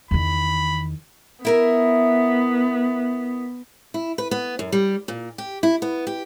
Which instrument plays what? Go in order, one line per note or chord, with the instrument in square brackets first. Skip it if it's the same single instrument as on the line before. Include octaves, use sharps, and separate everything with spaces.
[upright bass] E2 D#3 [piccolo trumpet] B5
[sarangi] B3 [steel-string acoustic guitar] E4 A#4 E5
[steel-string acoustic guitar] E4
B4
B3
F#2
G3
A#2
G4
E4
B3
G4